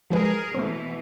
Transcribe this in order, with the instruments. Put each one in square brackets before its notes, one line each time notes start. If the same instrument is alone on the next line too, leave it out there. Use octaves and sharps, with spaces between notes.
[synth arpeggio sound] F3 G#3 B4 [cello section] G#4 A#4
[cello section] B2 E3 [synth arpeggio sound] A3 C4